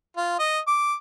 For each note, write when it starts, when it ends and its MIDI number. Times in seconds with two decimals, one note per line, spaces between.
0.17 0.36 65
0.39 0.59 75
0.68 0.95 86